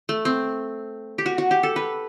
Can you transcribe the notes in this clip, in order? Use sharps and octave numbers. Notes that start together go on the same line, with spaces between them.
A3
C4
G4
F#4
F#4
G4
A4
B4